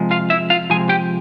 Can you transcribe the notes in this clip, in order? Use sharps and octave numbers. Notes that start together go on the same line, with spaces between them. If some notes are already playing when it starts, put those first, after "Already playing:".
Already playing: C3 F3 G#3
F4 F5
E4 E5
F4 F5
C3 F3 G#3 G#4 G#5
G4 G5